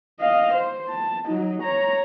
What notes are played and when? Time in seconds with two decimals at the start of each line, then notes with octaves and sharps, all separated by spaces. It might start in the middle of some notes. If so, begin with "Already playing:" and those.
0.20 D#5 F5
0.54 C5
0.89 A5
1.25 F#3 D#4
1.62 C#5 A#5